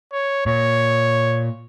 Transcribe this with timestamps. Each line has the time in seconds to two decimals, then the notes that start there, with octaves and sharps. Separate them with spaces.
0.12 C#5
0.46 A#2 C#5